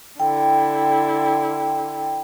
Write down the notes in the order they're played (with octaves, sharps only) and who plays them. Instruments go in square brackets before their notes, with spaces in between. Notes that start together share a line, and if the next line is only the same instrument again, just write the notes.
[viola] D3 E4 [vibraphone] G5